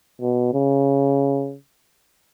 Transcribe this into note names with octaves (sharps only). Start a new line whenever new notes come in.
B2
C#3